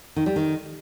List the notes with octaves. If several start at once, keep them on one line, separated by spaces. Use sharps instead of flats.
D#3
G3
D#3